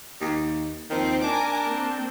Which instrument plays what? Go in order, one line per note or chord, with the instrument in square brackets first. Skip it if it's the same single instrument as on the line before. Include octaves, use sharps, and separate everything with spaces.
[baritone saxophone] D#2
[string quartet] D#2 F3 C4 [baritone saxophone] D#3
[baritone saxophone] D4 [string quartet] A#4 G#5 D6
[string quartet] A#3 C4